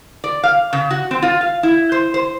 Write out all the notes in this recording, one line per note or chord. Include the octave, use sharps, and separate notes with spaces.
D5
F5
C#3
F#4
C4
F4
F5
E4
C5
C5